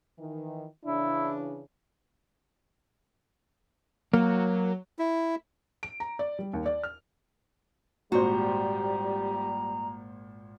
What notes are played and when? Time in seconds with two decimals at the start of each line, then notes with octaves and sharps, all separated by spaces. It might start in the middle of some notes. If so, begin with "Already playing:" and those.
0.19 D#3 E3
0.86 C#3 E3 D4 E4
4.13 F#3 A#3
4.99 E4
5.83 D7
6.00 A#5
6.19 D5
6.39 G3
6.53 D#2
6.66 D5
6.83 F6
8.12 G#1 A#2 G3 F#4 C5 A#5